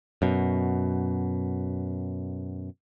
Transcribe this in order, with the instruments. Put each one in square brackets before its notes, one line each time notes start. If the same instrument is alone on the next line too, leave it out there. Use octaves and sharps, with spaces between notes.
[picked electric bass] F#2 B2